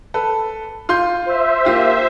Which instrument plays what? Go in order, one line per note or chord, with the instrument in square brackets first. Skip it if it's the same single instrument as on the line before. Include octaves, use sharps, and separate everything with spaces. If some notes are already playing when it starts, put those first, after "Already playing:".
[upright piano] A4 B4
F4 C6 G6
[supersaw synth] C5 E5
[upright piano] A#3 F4 G4